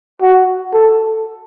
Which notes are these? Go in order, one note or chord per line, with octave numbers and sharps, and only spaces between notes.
F#4
A4